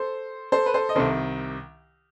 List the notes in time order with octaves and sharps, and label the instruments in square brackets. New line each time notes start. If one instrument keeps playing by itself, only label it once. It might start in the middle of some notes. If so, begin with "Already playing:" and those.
Already playing: [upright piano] A4 C5
A4 C5
B4
A4 C5
D#5
[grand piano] C2 C3 D#3 [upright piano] A4 C5